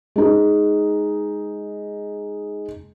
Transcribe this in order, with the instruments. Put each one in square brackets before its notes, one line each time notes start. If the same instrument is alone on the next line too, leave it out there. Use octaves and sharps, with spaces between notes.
[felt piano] G#3 D#4